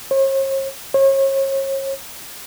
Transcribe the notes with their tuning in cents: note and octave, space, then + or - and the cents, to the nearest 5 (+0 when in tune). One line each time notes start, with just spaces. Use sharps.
C#5 -45
C#5 -35